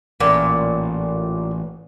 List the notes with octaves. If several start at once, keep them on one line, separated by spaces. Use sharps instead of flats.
A1 A#2